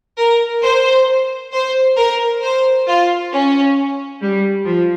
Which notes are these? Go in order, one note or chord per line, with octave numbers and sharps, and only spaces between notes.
A#4
C5
C5
A#4
C5
F4
C#4
G3
F3